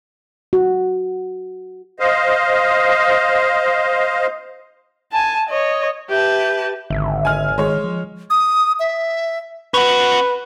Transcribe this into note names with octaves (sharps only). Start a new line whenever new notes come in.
F#4
C5 D#5 F5
G#5 A5
C#5 D#5
G4 B4 E5 A5 G6
G#1 D3 E5
G#5 F6
D#3 G#3 C#5
F3
D#6
E5
C#4 B4 F#5